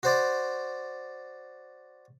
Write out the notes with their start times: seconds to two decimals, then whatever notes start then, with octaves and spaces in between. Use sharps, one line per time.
0.03 F#4 C5 D5